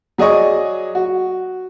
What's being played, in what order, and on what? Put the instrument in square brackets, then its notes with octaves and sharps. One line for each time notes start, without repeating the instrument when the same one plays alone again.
[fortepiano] F#3 G#4 D5 D#5 C#6
F#4